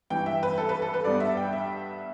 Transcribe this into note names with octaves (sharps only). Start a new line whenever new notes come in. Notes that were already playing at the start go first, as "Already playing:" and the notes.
G2 E3 G3 G5
E5
B4
A4
B4
A4
B4
G2 G3 B3 D5
E5
G5
E5